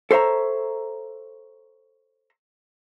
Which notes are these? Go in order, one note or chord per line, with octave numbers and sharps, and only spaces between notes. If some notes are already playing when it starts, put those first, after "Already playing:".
A4 C5 C#5 E5 A#5